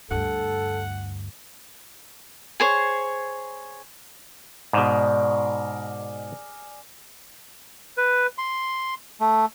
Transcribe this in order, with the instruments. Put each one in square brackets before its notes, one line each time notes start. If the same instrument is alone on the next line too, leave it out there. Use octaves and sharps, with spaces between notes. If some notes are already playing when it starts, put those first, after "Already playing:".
[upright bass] D2 G2 [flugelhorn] A4 [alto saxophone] F#5
[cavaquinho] G#4 C5 C#5
[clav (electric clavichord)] G#2 B2 [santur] G#4 A#4 D5
[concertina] B4
C6
A3